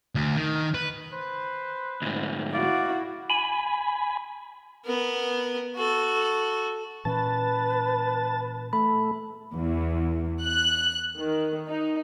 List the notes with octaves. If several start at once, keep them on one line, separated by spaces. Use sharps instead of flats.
D2
D#3
B4
B4 C5
D2 G#2
E4 F#4 D5 F5
G#5 B5
B3 A#4
F#4 A4
A#2 E3 C#4 B4 A5
A3 B5
E2
F#6
D#3
D#4